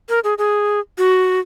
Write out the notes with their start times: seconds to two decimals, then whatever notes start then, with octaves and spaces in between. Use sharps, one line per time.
0.09 A#4
0.24 G#4
0.38 G#4
0.98 F#4